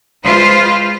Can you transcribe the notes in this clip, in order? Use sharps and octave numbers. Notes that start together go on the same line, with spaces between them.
G#3 F4 B4 C5